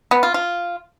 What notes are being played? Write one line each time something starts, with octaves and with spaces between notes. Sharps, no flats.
B3
F4
F4